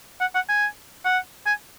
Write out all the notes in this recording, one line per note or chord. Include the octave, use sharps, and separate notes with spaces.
F#5
F#5
G#5
F#5
G#5